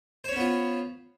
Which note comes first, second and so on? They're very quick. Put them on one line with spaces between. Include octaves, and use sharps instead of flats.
C5 C#5 C#4 B3 F4